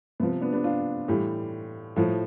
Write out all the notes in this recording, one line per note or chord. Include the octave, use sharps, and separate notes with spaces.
C3 F3 B3
B3 D4
B3 D4
D4 F4
A2 E3 G3
A2 F3